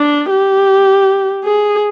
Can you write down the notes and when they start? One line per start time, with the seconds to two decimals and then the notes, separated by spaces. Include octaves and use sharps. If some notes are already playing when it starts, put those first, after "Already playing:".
Already playing: D4
0.30 G4
1.44 G#4